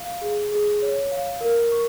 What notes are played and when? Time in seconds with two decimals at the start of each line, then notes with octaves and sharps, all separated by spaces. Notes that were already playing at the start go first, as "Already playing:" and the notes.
Already playing: F5
0.21 G#4
0.51 G#4
0.82 C#5
1.12 F5
1.41 A#4
1.72 C#6